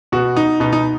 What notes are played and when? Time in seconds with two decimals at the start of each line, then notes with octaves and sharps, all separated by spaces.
0.12 B2 F#4
0.36 D#4
0.60 B2 D#4
0.73 D#4